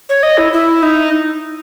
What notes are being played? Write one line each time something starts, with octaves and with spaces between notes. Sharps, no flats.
C#5
D#5
E4
E4
D#4